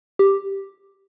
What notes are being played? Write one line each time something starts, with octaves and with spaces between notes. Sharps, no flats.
G4